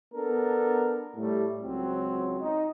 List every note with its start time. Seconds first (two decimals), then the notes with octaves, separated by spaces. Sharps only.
0.14 B3 D4 A4 A#4
1.16 A2 G3 A3
1.62 C#2 F#3 C4
2.40 D#4